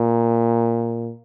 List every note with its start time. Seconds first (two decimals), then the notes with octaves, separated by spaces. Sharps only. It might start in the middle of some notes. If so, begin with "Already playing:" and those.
Already playing: A#2